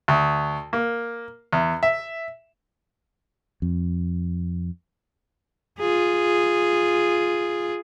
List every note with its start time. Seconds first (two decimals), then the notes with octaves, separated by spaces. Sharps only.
0.08 D2
0.73 A#3
1.53 E2
1.83 E5
3.62 F2
5.79 F4 G#4